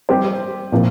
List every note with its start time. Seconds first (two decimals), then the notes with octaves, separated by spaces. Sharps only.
0.09 G3 C4 G4 C5
0.72 A#2 F3 C4